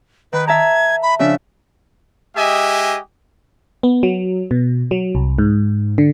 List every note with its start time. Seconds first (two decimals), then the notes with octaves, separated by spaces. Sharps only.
0.33 D#3 B4
0.47 E5 A5 A#5 G#6
1.02 B5
1.19 C#3 F3 D4 E5
2.36 G#3 G4 D#5 E5 G#5
3.83 B3
4.03 F#3
4.51 B2
4.91 F#3
5.15 C2
5.38 G#2
5.98 D3